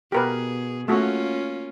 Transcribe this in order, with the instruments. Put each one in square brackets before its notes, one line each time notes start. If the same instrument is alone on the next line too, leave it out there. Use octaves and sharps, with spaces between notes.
[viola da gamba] B2 G#4 [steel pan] G4 A#4 B4
[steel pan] A3 F#4 [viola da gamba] A#3 C#4 F4